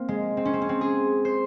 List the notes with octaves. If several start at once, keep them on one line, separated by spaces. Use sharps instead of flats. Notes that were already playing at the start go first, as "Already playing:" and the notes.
Already playing: A#3 C4
G#3
C4
C#4
C4
C#4
C4
G#4
C5